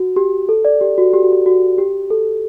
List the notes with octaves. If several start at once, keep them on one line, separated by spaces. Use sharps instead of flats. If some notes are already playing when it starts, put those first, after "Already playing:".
Already playing: F#4
G4
A4
D5
G4
F#4
G4
F#4
G4
F#4
G4
A4